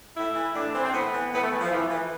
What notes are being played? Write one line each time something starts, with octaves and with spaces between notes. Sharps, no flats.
A2 E4
E3
A2 D4
E3 C4
C4
A2 B3
E3
A2 B3
A3
E3
F3
F2 E3
E3